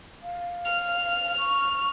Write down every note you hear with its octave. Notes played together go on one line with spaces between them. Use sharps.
F5
F6
C#6